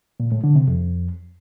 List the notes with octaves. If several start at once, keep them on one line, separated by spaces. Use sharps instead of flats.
A#2
A2
D3
C3
F2